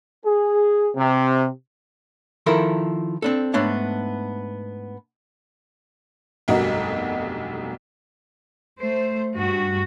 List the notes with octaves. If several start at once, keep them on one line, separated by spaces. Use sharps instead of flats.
G#4
C3
D#3 F3 E4 A4 A#4
C4 D4 A4
G#2 A3 B3 D4 C#5 A5
F1 B1 G2 F#4 A#4 D#5
A3 C5
G2 F#4